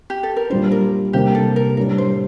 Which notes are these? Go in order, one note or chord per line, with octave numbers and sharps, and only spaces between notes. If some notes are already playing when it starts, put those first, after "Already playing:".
G4
A4
A#4
A#2 G3 D4 C5
A#4
C3 G3 A#3 D4 G4
A4
A#4
A2 G3 D4 A#4
C5